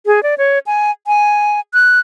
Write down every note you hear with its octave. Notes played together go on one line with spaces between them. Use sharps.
G#4
D5
C#5
G#5
G#5
F#6